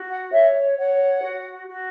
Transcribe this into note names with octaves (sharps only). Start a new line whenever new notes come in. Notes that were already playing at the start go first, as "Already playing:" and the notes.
Already playing: F#4
F#5
C#5 E5
C#5 F#5
F#4
F#4